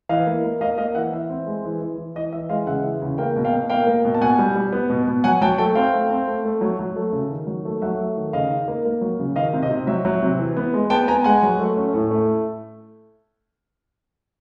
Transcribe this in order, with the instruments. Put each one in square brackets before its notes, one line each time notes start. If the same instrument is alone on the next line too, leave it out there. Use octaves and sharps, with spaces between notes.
[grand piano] E3 D#5 F5
A#3
A#3
A#3 D#5 F5
A#3 D#5 F5
E3 E5 F#5
E3 E5
C4
G#3
E3
E3
E3
E3 D#5
E3 E5
G#3 D#5 F5
C#3 E5 F#5
E3
C#3
A#3 F5 G5
B2
F5 G5
B2
A#3 F5 G5
A#3
B2
A5
B2 F#5 G#5
G3
G3
B3
B2
B2
F#3 F#5 G#5
F#3 G5 A5
A3 G5 A5
C4 F5 G5
A3
C4
A3
A3
F#3
F#3
A3
C#3
D#3
F#3
A3
F#3 E5 F#5
A3
D#3
C#3 D#5 F5
D#4
A#3
A#3
F#3
C#3
D#3 D#5 F5
C3
D#5
C3
F#3 E5
F#3
C3
E3
B3
G#3
B3 G5 A5
B3 G#5 A#5
G#3 F#5 G#5
F#3
A3
C#4
A2
A3